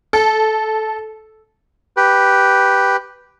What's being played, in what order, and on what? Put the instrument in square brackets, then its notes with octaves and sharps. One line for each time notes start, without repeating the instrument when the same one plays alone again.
[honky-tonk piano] A4
[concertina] G4 B4